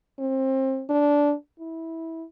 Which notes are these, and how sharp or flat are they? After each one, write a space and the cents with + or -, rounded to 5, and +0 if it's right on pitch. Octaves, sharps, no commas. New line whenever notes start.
C4 +25
D4 -15
E4 -15